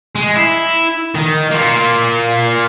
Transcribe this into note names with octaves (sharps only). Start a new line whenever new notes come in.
G#3
E4
D#3
A#3 F4